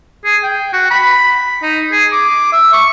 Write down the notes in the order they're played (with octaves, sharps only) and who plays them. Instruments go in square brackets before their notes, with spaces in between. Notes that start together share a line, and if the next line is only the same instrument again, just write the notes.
[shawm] G#4
G5
F#4
B5
D#4
G#4
D6
E5
C#6